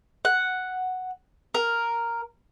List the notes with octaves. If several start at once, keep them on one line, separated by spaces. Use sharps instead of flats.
F#5
A#4